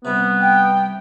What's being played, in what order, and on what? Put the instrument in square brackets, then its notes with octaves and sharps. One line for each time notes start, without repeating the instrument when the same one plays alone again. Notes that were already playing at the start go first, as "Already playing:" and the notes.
[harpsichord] G2 C3 [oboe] B3
[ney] G5